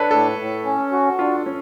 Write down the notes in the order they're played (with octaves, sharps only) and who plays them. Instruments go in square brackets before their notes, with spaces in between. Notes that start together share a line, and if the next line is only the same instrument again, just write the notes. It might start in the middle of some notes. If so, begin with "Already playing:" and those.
Already playing: [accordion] D4 [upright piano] A4 B4 C#5
[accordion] A2 [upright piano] A4
[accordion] A2
C#4
F#4
[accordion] D4 [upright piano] F4
[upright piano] C#4